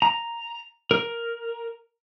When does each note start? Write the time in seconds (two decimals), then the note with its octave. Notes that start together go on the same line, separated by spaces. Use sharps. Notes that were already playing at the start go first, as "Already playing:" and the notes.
0.02 A#5
0.91 A#4